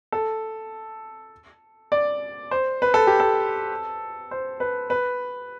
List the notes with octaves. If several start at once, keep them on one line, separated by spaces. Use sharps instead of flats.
A4
D5
C5
B4
A4
G4
A4
C5
B4
B4